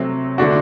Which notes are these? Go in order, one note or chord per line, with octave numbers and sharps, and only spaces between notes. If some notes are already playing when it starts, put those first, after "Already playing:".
Already playing: C3 F#3 A3 C4
D3 A3 D4 F#4